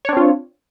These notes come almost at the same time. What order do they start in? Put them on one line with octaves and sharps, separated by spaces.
C#5 D4 C4 F4